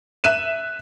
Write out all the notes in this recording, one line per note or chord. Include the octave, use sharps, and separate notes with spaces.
E5 F#6 D#7 E7